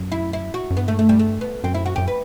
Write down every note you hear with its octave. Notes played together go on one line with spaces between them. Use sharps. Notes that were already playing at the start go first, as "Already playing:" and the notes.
Already playing: F#2
E4
E4
F#4
F#2
G2 B3
A3
A3
G3
A3
B3
F#2 C4
E4
F#4
F#2 G4
B4